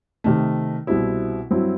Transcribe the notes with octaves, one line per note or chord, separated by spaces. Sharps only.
C3 D#3 A3
C2 B2 G3 C4 E4
G2 F#3 C4 E4